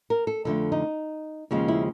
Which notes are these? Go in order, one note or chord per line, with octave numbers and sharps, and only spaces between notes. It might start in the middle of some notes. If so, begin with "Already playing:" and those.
A#4
A4
F2 D3 F3 A3 A4
D#4
D#2 C#3 F3 G#3
E4